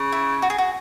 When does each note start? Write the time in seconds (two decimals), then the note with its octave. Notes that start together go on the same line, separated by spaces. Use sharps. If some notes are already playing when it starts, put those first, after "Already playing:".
Already playing: C#3
0.12 E4
0.42 F#4
0.50 G#4
0.58 F#4